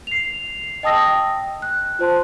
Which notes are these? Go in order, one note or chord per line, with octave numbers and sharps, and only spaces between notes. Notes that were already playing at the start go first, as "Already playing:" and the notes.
C7 F7
D#5 G5 A5 D#6 E6 A#6
G5
F#6
F4 C5 A5 C6